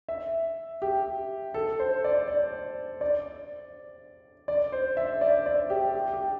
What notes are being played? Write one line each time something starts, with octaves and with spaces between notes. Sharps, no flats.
E5
G4
A4
C5
D5
D5
D5
D5
C5
E5
D5
D5
G4
G4
G4